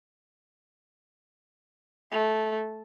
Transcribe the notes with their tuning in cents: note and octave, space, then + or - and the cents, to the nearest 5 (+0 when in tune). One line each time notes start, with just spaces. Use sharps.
A3 -15